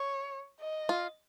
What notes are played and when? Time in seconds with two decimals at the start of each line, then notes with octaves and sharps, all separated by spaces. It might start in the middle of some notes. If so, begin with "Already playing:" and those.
Already playing: C#5
0.61 D#5
0.89 F4